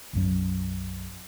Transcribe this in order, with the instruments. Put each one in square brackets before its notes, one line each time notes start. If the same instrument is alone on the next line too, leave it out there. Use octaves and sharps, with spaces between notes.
[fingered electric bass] B1 F#2 F#3